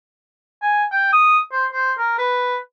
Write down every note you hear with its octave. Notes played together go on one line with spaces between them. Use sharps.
G#5
G5
D#6
C5
C5
A#4
B4